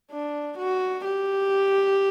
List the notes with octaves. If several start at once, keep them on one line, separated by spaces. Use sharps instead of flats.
D4
F#4
G4